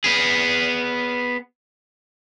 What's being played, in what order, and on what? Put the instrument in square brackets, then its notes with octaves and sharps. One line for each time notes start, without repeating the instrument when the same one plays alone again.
[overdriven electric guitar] B3 G#4